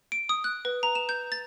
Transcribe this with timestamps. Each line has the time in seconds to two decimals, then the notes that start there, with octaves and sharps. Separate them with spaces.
0.12 D7
0.29 D#6
0.44 F#6
0.65 B4
0.83 A#5
0.95 E7
1.09 G6
1.32 A6